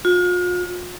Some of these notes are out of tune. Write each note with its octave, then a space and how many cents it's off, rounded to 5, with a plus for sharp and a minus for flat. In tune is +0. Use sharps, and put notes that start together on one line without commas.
F4 +40